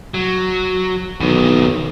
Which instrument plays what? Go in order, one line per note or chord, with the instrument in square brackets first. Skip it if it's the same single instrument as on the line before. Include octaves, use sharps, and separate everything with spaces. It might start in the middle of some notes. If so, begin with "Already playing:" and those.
[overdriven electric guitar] F#3
[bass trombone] B1 [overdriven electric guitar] E2 D#3